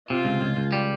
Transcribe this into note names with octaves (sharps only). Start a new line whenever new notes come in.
C3 F4
C#2
C#2
C#2
G3